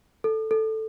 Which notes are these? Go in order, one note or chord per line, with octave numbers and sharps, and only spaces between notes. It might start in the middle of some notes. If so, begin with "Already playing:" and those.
A4
A4